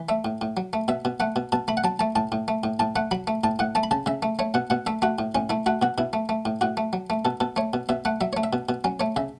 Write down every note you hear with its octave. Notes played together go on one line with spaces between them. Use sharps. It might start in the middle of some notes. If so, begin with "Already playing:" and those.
Already playing: E3
A3 E5
A2
A2
F#3
A3
B2 E5
B2
A3 F#5
B2
B2 A5
A3 B5
F#5
F#3 A5
A3 A5
A2 A5
A2
A3
A2
A2 A5
A3 F#5
F#3 B5
A3
A2 A5
A2 F#5
A3 A5
B5
C#3 A5
C#3 E5
A3
A3 C#5
B2 F#5
B2 F#5
A3 E5
A3 F#4
A2
A2 C#4
A3 E4
A3 F#4
B2 F#4
B2 E4
A3
A3
A2
A2 F#4
A3
F#3
A3
B2 A4
B2 A4
A3 C#5
B2
B2 E5
A3 F#5
F#3 E5
A3 C#5
E5
B2
B2
F#3 C#4
A3 C#5
C#3 E5